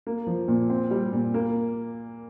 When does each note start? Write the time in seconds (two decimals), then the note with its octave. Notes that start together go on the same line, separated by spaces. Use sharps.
0.07 A#3
0.27 F3
0.48 A#2
0.70 C4
0.91 G3
1.13 A#2
1.34 A#3